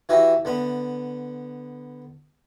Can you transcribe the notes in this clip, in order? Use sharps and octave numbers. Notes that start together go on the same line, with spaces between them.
E3 E4 F#4 G4 E5 A#5
D3 B3 B5